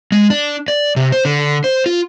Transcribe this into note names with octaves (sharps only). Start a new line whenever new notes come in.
G#3
D4
D5
C3
C5
D3
C5
F4